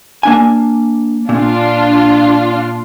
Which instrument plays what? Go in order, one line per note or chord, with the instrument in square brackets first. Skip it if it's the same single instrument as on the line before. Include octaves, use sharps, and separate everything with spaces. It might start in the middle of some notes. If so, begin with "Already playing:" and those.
[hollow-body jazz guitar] A#3 D4 G#5
[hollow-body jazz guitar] A#2 [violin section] D4 F4